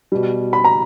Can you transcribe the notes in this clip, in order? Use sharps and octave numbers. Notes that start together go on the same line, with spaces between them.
B2 G3
B5
A#5